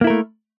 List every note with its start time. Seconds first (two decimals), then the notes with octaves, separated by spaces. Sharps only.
0.01 A#3
0.04 E4
0.07 A#4
0.10 A3